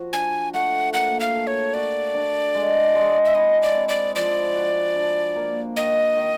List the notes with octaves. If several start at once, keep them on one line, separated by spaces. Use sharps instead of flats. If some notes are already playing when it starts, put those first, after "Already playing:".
Already playing: F3 F#4
D4 G#5
A3 F#5
A#3 F#5
F5
A4
C#5
F#4 D5
D4
G#3
G#3
E5
E4 D#5
D5
C4
D5
F3 D5
F#4
D4
A#3
D#3 D#5
D#3